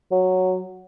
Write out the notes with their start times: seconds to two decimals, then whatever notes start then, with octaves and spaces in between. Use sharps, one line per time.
0.11 F#3